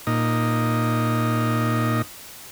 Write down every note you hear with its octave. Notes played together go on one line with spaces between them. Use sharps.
A#2 D#4